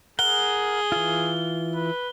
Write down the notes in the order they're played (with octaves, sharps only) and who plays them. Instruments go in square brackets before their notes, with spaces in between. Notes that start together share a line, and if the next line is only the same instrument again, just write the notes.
[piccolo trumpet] G#4 [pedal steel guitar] A#4 F#5 [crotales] G7
[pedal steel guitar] E3 F4
[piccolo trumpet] B4